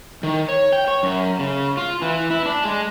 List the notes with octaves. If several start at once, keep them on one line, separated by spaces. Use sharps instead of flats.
D#3
C#5
G5
C#5
F#2
C#3
F4
E3
E4
D4
G#3